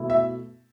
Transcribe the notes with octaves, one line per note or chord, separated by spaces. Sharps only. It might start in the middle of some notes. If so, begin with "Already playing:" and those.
Already playing: B2 A3 E4
E5